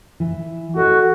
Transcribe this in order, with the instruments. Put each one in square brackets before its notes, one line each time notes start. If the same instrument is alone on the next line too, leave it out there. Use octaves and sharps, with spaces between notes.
[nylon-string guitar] E3
[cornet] F#4 [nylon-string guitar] A4 D#5